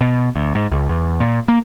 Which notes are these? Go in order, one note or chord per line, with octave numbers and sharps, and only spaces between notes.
B2
D2
G#2
C#2
E2
A#2
A#3